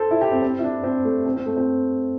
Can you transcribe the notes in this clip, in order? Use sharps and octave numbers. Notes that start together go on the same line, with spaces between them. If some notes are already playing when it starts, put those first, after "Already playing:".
Already playing: A4 C5
E4
G4
C4
C4
E4
D4
C4
A3
C4
C4
A3
C4